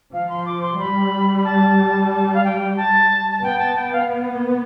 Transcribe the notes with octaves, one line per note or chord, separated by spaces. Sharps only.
F3 F5
C6
D6
C6
G3 B5
B5
A5
A5
F5
G5
A5
A5
B3 G5
A5
G5
F5